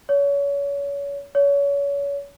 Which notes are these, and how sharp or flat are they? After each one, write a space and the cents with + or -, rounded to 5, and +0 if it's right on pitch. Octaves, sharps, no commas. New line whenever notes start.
C#5 +30
C#5 +30